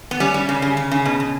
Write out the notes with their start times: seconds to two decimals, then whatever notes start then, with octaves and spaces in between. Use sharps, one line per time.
0.11 B3
0.20 G3 C#4
0.34 G3
0.49 C#3
0.62 C#3
0.77 C#3
0.91 C#3
1.05 B2
1.20 B2